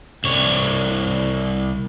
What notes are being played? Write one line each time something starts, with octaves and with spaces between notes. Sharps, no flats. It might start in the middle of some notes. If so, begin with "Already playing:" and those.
C2 C#5